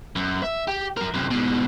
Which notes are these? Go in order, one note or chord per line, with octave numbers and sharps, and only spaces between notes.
F#2
E5
G4
F#3 A#4
F#2 C3
G#2 B2